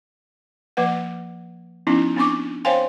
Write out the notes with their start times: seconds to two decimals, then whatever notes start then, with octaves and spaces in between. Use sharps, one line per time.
0.77 F3 A#3 B4 F#5
1.87 F3 B3 C#4 D#4 E4
2.16 B3 C4 D4 C#6 D6
2.65 C5 C#5 F5 G5 G#5 C6